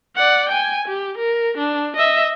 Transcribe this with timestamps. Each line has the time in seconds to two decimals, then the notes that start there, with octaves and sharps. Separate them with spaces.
0.16 D5 F#5
0.49 G5 G#5
0.88 G4
1.18 A#4
1.57 D4
1.96 D#5 E5